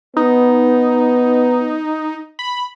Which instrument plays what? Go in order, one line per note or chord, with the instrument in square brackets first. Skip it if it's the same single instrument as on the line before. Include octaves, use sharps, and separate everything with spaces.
[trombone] B3 [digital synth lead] D#4
[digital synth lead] B5